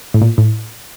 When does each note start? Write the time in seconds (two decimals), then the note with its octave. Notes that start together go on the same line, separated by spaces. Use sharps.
0.14 A2
0.22 A#2
0.38 A2